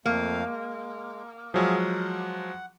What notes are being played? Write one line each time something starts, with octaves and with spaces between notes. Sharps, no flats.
F2 A3 A#3 F5
G#3
F3 F#3 G#3 G#4 E5 F5
F#5